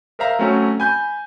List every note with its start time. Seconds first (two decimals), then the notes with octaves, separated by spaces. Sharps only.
0.19 A#4 C5 E5 F5 A#5
0.39 F#3 A3 C4 C#4 F#4
0.80 G#5 B5 G6